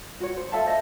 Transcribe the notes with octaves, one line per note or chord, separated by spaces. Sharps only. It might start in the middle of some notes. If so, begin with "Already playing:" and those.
F#4 C#5
C5
A4 E5 F5 A5
C5 D#5 E5 A5